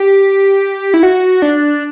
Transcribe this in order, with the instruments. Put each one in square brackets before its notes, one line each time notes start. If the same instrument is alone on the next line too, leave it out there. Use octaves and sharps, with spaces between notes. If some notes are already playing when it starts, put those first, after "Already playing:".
Already playing: [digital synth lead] G4
E4
F#4
D4